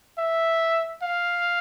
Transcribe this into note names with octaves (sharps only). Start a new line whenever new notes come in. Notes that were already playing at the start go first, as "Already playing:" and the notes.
E5
F5